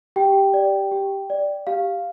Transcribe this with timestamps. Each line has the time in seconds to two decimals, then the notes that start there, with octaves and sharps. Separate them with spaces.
0.16 G4 G5
0.54 D5
0.92 G4
1.30 D5
1.67 G4 F5